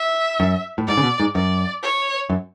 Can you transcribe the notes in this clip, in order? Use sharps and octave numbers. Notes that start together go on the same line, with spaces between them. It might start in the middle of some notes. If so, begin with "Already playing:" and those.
Already playing: E5
F#2
A2
G#2 D5
C#3
B2
G#2
F#2 D5
C#5
F#2